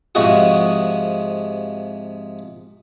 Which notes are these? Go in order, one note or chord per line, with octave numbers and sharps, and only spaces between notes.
G#2 C3 F3 G#3 F#4 G#4